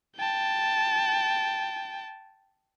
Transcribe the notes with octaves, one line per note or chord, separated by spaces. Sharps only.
G5 A5